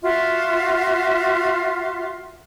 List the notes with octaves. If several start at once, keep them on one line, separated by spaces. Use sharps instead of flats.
F4 F#4 E5